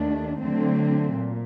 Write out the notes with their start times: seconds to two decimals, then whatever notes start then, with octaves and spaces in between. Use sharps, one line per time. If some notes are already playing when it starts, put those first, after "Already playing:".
Already playing: D#2 D#3 A3 D4
0.40 D3 F#3 A3 C4
1.16 A#2